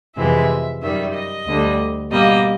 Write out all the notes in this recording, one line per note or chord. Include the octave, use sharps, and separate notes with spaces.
F2 C3 E3 G#3 E5
F#2 D#3 G3 E5
D#5
D2 D3 G3
B2 G3 A#3 D#5